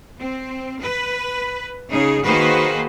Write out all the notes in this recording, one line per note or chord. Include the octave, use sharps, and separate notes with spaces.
C4
B4
C#3 D#4 G#4
D#3 A#3 F#4 G#4 B4 C5